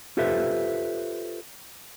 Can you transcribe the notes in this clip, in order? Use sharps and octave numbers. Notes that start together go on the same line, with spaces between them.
F4 G4 A4 B4 C5 E5